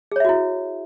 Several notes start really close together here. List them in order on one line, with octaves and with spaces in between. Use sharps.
G#4 C#5 E5 F#4 E4